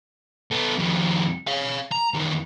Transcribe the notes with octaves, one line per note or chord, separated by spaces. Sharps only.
B3 A4
F2 D#3
C#5 F5
A#5
E2 D#3